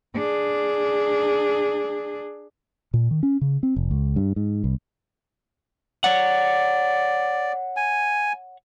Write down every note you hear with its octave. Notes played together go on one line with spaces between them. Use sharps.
D4 G#4
A#2
D#3
C#4
C#3
C4
F1
C#2
G2
G#2
C2
C#5 D5 F#5
G#5